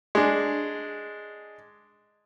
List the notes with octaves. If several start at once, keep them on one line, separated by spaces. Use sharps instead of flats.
G#3 D4